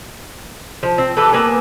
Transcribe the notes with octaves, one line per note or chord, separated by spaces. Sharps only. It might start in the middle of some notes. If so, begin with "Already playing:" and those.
F3
C4
E3 G4 A4 B4
A#3 B3 B4 G#5